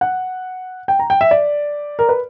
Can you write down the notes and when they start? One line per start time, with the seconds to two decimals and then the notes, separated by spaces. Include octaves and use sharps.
0.01 F#5
0.88 G5
0.99 A#5
1.10 G5
1.21 E5
1.31 D5
1.99 A#4
2.09 B4